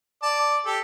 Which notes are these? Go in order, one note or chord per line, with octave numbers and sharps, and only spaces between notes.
D5 A5
G4 A4